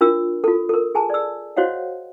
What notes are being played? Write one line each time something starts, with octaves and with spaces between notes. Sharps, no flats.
D4 F4 A#4 E6
F4 A4
A4 A#4
G#4 G#5 A5
D5 E6
F#4 C5 C#5 D#5 F5 F#5